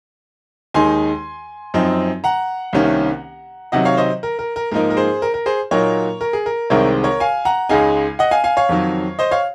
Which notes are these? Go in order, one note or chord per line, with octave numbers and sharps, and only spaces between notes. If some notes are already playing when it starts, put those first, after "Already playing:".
D#2 D#3 G#3 D#4 G#5 C6
F#2 F3 C4 D#4
F#5 A#5
C2 C3 D#3 A#3 C#4
C3 D#3 F#3 D#5 F#5
C#5 F5
C5 D#5
A#4
A#4
A#4
G#2 F3 A#3 D#4 A#4
A#4
G#4 C5
A#4
A#4
G#4 C5
A#2 F#3 A#3 D#4 A#4 C#5
A#4
G#4
A#4
C2 C3 D#3 G#3 C4 A#4 C#5
A#4 C#5
F5 G#5
F#5 A#5
C#2 C#3 G#3 D#4 F5 G#5
D#5 F#5
F5 G#5
F5 G#5
C#5 F5
F2 D#3 F#3
C5 D#5
C#5 F5